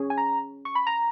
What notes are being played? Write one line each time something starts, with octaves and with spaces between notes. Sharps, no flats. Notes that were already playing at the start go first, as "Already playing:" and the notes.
Already playing: C#4 G#4 C#5
G#5
A#5
C#6
B5
A#5